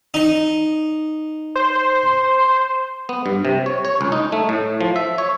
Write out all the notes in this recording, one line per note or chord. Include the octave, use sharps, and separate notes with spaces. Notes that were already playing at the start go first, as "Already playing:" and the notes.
D#4
C5
B3
G2
C3
C#5
C#5
C#2
D#4
A3
A2
F3
E5
C#5